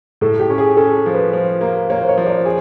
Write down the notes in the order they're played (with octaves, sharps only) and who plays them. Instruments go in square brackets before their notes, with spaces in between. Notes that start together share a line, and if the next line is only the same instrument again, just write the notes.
[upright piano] A2 [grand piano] A4
[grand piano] G4
[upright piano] C#4
[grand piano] G#4
[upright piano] C#4 [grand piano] A4
[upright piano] F3
[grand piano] B4
[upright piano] F3
A#3
[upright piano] A#3 [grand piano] C#5
[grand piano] C5
C#5
[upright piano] F3
[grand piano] D5
[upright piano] G#4